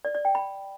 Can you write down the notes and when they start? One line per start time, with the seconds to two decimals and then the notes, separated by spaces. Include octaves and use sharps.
0.05 D5
0.15 D5
0.25 G5
0.35 B5